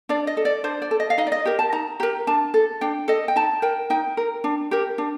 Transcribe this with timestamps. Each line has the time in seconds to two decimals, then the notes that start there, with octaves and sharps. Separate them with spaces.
0.09 D4 D5
0.27 D#5
0.37 A4
0.45 D5
0.64 D4 C5
0.82 D5
0.91 A4
1.00 D#5
1.10 F5
1.18 D#4 D#5
1.27 D5
1.32 D#5
1.45 G4 A#4
1.59 A5
1.72 D#4 A#5
2.00 G4 A#4 A#5
2.27 D4 A5
2.54 A4
2.81 D4 G5
3.08 A4 D#5
3.28 G5
3.36 D#4 A5
3.62 A#4 G5
3.90 D#4 G5
4.17 A#4
4.44 D4
4.71 G4 A#4
4.98 D4